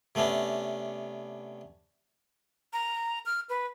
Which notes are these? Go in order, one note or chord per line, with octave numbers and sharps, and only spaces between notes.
C3 A3 B3 C#4 D4
A#5
F6
B4